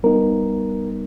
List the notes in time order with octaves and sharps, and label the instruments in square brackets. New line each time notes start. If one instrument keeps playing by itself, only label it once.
[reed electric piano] G3 B3 D#4 A#4